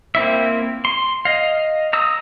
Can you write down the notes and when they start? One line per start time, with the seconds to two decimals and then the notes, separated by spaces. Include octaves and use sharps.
0.15 A#3 C4 E4 E5
0.85 C6
1.25 D#5 F5
1.93 A#5 D#6 E6